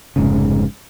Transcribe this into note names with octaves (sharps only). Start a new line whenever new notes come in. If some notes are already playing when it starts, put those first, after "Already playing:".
F1 G#2 C#3